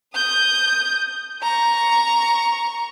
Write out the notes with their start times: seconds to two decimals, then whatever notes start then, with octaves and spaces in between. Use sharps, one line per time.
0.15 D#6 G6
1.42 A#5 C#6